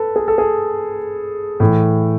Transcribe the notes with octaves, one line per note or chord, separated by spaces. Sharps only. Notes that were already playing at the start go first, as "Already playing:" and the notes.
Already playing: A4 B4
G#4
A4
G#4
A2 E3